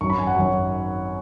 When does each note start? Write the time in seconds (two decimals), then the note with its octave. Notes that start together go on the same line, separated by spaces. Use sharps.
0.01 G#1 F#2 F#3 C#6
0.10 B5
0.18 G#5
0.27 F#5
0.35 G#1 F#2 F#3 C#5